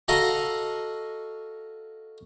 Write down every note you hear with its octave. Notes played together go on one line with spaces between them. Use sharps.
F#4 A4 D#5 F5 A#5 C#6